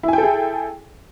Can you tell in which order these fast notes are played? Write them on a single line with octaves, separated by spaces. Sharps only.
E4 G#5 G5 A4 G#4